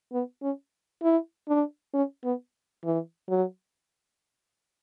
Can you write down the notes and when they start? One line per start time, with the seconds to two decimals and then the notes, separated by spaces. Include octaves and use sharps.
0.12 B3
0.42 C#4
1.03 E4
1.48 D4
1.94 C#4
2.24 B3
2.84 E3
3.29 F#3